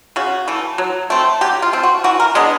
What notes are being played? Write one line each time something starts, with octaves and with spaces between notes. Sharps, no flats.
C#3 F#4
E3 A3
F#3
A3 C4
F#3 G4
F4
A3 C4
F#4
E3 F#4
A#4
G#3 B3 D4 D#5